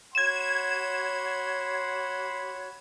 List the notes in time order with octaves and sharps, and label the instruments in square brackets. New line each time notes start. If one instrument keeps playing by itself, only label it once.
[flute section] F#4 C#5 [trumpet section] F#5 B5 C6 [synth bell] G#6 E7